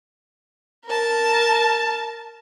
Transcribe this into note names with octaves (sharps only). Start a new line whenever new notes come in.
A#4 A5